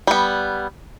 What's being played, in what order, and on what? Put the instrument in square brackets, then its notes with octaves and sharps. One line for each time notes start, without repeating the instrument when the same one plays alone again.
[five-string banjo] G3 B3